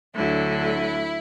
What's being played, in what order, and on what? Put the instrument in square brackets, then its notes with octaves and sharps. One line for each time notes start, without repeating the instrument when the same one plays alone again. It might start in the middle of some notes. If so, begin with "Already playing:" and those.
[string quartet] D2 D3 F#3 E4